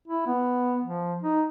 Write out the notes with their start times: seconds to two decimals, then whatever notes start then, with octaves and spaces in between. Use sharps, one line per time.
0.08 E4
0.27 B3
0.84 F3
1.23 D#4